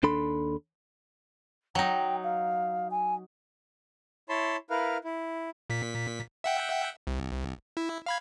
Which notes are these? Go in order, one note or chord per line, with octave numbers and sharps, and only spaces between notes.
D#2 D4 A4 B5 C6
F#3 D#4 G5
F5
G#5
E4 C#5 A5 B5 C6
E4 A#4 B4 F5
E4
A#2 B6
E5 F#5 G5
C2
E4
F5 B5 G#6